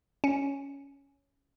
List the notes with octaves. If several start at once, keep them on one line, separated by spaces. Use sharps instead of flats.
C#4